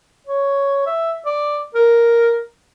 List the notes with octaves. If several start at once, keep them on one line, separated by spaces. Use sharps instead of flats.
C#5
E5
D5
A#4